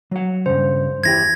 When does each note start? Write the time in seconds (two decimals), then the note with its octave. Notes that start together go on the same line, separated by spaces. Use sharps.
0.11 F#3 F#5
0.46 G2 C#3 C5
1.04 E2 E4 G4 G#6 A#6